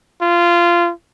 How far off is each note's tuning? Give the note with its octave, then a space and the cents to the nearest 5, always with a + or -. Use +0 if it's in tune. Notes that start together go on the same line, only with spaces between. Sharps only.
F4 -20